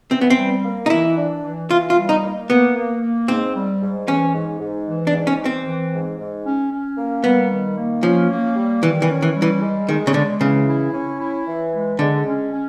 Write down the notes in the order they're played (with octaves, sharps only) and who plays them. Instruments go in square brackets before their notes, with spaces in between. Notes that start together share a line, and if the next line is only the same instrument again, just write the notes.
[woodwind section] E3 [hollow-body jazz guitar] C4
[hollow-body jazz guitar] B3
C4
[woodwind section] G3
A#3
[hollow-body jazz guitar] D#4
[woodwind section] E3 [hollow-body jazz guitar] E4
[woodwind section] D4
E3
[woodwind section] E3 [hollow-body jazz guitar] F4
[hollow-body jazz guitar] F4
[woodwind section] G3
[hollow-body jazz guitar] D#4
[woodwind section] A#3
[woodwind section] A#3 [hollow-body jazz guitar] B3
[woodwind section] A#3
A#3
[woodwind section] G#2 [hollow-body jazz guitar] C4
[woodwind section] G3
G#2
[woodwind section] E3 [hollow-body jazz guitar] C#4
[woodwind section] G#2
G#2
E3
[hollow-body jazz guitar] D4
[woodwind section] G#2
[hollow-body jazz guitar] C#4
[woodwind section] E3
[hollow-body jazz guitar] C4
[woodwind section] E3
G#2
G#2
C#4
C#4
A#3
[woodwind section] G3 [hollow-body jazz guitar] B3
[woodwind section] D#3
A#3
[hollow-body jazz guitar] F3 [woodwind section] C#4
[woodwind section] A#3
G3
[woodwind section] D#3 [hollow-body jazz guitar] E3
[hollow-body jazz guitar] E3
[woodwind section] C#4
[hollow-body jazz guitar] E3
[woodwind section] G3
[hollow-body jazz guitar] E3
[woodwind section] G#3
[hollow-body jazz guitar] D#3 [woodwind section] G#3
[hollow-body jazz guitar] C#3
[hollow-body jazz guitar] D3 [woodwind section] G#3
[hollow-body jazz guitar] C#3 [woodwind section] E3
[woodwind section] E4
C#4
E4
E3
G#3
[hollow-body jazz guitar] D3 [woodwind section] G#3
[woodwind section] C#4
C#4